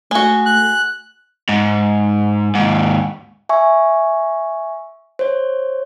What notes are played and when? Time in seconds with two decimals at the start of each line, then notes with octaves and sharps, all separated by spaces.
0.11 G#3 A3 F#4
0.46 F#6
1.49 G#2
2.55 D#2 G#2
3.49 E5 G#5 C#6
5.19 C5 C#5